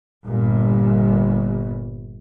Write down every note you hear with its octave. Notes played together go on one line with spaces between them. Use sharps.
G1 A#2